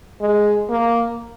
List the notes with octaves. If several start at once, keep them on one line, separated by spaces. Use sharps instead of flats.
G#3
A#3